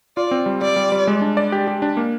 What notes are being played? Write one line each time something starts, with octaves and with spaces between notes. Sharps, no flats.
F4 D5
C4
G3
G3 D5
G3
G3
G#3
D4
D5
G4
G4
D4
A#3